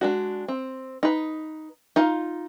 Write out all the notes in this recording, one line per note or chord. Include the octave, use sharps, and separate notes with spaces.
G#3 D4 F#4
C4
D#4 B4
D#4 F4 F5